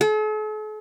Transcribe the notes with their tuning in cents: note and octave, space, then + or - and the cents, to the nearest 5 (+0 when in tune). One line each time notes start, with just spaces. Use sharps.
A4 -45